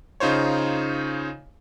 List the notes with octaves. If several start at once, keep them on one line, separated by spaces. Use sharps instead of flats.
C#3 D#4 F4 C5 C#5